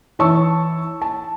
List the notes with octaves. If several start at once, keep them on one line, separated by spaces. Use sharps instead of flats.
E3 C#5 A5 C#6 E6
A5